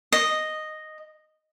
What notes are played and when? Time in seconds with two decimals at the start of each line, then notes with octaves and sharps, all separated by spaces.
0.12 D#5